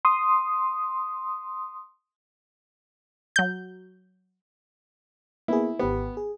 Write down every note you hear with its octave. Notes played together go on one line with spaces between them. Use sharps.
C6 D#6
F#3 G6
A#3 B3 E4 G#4
G#1 B3 G4
G#4